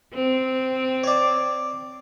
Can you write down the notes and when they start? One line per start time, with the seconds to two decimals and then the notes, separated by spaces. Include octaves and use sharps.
0.14 C4
1.04 C#5 D5